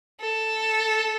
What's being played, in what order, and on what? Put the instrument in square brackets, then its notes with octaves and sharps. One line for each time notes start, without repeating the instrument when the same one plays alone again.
[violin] A4